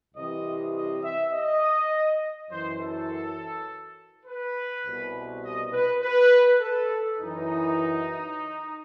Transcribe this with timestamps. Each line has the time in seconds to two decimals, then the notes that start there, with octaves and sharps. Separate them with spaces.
0.15 C2 C3 E3 D#5
0.75 D#5
1.03 E5
1.33 D#5
2.51 F#2 E3 C5
2.79 A4
4.26 B4
4.86 C2 B2
5.44 D#5
5.73 B4
6.02 B4
6.61 A4
7.19 F#2 E3 D#4